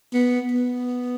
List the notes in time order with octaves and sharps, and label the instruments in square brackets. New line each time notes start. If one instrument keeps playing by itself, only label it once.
[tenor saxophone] B3
B3